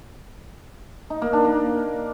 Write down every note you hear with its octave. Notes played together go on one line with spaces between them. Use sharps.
D#4
A#3
D4
A#3